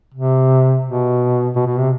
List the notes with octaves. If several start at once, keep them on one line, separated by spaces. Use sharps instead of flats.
C3
B2
B2
B2
C3